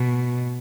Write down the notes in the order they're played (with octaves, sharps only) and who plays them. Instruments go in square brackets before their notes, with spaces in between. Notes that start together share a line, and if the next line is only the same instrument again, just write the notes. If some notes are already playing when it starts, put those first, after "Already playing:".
Already playing: [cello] B2